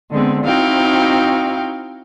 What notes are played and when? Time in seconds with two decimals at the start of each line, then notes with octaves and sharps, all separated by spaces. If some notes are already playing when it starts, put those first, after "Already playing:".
0.11 D3 G#3 B3 C4
0.45 C4 D#4 E4 F#4 F5 G5